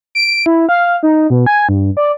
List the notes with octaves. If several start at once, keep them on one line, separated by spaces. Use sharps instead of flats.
D7
E4
F5
D#4
B2
G#5
G2
D5